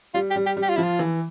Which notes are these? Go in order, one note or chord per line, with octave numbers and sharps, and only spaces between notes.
G3 F4
G4
G3
G4
G3
G4
F4
F3 E4
F4
E3